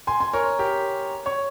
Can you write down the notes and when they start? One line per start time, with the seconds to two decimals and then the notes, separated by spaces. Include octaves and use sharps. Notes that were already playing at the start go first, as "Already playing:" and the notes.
0.07 G#5 C6
0.20 G#5 C6
0.33 A#4 C#5
0.59 G4 A#4
1.26 C#5